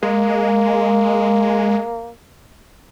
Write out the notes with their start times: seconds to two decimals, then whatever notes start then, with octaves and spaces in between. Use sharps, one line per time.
0.03 G#3 A#3